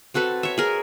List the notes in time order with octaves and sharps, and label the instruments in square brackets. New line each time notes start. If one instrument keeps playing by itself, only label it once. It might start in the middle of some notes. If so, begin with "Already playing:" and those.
[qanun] C4 F#4 A4 B4
C#5 E5
G#4 A#4